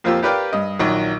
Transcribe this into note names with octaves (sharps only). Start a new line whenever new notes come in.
F2 A#3 C4 F4 G4 E6
G4 A#4 B4 D5 F5 G5
G2 D#5
A#1 D#3 F#3